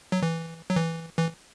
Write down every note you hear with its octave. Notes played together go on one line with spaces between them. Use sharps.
F#3
E3
F#3
E3
E3